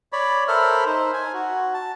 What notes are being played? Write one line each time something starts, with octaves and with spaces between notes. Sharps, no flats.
C#5 D5 B5
A4 A#4 C5 E5 B5 F6
D#4 C5
G#5
F#4
A5